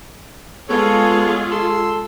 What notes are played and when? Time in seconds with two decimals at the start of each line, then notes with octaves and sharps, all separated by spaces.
0.69 G#3 B3 F4 G#4 A4 C#5
1.51 A4 C6 E6